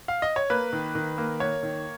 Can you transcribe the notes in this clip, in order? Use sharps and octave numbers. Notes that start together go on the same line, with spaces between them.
F5
D#5
C#5
A#3 B4
D#3
D#3
A#3
A#3 C#5
D#3